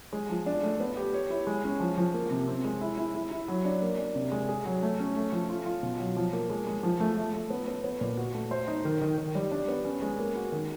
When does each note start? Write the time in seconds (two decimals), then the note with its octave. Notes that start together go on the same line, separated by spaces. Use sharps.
0.13 G#3
0.30 F3
0.46 D4
0.63 A3
0.80 B3
0.97 G4
1.13 C#5
1.30 E4
1.47 G#3
1.64 C#4
1.80 F3
1.98 F3
2.14 A#3
2.31 C3
2.48 C4
2.65 G#3
2.81 E4
2.98 E4
3.15 E4
3.31 E4
3.48 F#3
3.65 D4
3.82 A#3
3.99 D4
4.15 C3
4.32 G#3
4.49 G#4
4.65 F#3
4.82 A3
4.99 C#4
5.16 A3
5.32 F3
5.50 F4
5.66 F4
5.83 B2
6.00 F#3
6.17 F3
6.33 A#3
6.50 G#3
6.67 G#3
6.83 F3
7.00 A3
7.17 A3
7.34 A3
7.50 B3
7.68 B3
7.84 B3
8.01 A#2
8.18 F#4
8.34 A3
8.51 C5
8.68 D#4
8.85 D#3
9.01 D#3
9.18 D#3
9.35 G3
9.52 D4
9.68 B3
9.85 C#4
10.02 G#3
10.18 A#3
10.36 F#4
10.52 D#3